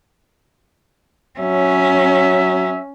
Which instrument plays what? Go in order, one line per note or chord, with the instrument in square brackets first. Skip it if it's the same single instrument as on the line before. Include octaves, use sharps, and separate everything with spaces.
[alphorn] F#3 [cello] C#4 [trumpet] E5